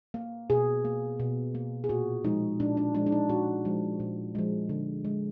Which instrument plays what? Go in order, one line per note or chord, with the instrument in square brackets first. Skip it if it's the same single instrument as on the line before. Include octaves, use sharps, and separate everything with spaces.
[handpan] A#3
B2 G#4
A#3
B2
A#3
G#4
A#2 F#4
F3 G#3 D#4
A#2 D4
D4
F3 G#3 D4
D4
D#4
A#2 F#4
F3 G#3
A#2
F3 G#3
D3
G#3